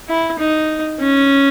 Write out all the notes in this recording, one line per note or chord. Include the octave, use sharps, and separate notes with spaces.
E4
D#4
C#4